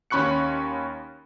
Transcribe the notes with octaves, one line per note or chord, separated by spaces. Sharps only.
D#2 C#4 B5 C#6 F#6 C#7